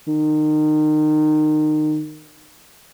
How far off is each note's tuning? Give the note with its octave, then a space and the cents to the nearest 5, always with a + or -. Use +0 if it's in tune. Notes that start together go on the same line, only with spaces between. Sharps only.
D#3 -25